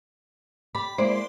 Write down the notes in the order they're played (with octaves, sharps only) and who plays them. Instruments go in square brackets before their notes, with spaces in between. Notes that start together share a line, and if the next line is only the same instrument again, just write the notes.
[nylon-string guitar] G4 D5 [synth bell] B5
[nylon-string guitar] G#3 A#3 E4 [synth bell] C5 D5